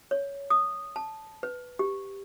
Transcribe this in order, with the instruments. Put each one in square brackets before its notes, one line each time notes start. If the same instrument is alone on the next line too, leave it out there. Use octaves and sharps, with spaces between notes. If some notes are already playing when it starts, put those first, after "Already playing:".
[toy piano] C#5
D#6
A5
B4
G4